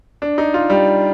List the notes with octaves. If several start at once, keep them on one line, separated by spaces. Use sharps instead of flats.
D4
D#4
F4
G3